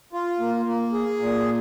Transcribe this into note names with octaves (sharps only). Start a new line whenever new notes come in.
F4
A#3
A#3
G#4
A#2